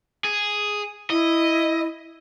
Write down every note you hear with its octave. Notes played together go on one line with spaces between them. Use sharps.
G#4
E4 D#5